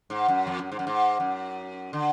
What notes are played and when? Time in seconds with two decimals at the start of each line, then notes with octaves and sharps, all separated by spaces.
0.10 G#2
0.28 F#2
0.47 F2
0.59 F#2
0.72 G#2
0.79 F#2
0.87 G#2
1.20 F#2
1.93 D3